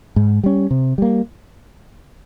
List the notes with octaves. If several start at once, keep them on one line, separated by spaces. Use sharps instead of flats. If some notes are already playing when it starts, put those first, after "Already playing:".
G#2
G3 C#4
C3
G3 A#3